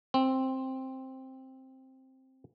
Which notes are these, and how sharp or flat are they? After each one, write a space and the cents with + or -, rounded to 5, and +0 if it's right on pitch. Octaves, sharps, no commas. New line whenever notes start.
C4 +5